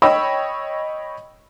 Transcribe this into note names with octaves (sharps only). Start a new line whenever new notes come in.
C#5 D#5 G5 B5 E6